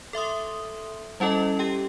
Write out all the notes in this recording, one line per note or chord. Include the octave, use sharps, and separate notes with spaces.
A4 E5 C6 D#6
G3 C#4 E4 A4 D#5
G4 G5